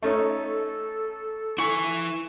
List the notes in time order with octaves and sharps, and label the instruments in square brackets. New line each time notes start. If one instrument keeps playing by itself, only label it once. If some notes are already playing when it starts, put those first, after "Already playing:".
[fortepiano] A3 C#4 D#4 [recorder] A4
[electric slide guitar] E4 G#5 [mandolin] C#6